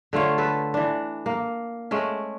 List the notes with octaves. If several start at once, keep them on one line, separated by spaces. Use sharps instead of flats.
D3 A3 F4 C#5
A4 B4
E3 D4
A#3
G#3 A3 C#4